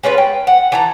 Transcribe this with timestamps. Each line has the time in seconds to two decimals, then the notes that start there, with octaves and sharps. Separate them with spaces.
0.03 G#3 C#4 F4 B4
0.18 G5
0.47 F#5
0.72 E3 A4 A#5